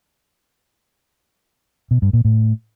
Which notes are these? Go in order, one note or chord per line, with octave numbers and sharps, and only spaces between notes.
B2
G2
A#2
A2